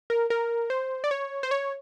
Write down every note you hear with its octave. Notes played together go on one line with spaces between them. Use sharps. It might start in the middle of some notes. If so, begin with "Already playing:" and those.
A#4
A#4
C5
D5
C#5
C5
C#5